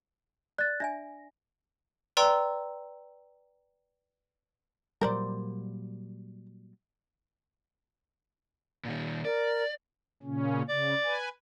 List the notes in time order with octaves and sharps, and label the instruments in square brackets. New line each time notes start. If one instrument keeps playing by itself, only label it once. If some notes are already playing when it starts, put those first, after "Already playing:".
[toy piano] D5 [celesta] F#6 A6
[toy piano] D4 E5 G#5 [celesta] A#6
[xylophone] B4 D5 G5 A#5 C6 E6
[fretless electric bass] A#2 F#3 G3 [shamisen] A#4 C5 D5
[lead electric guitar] A#2 D#3
[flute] A#4 [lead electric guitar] D5
[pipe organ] A#2 C#3 C#4
[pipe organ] C#3 [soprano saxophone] D5
[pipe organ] B4 G#5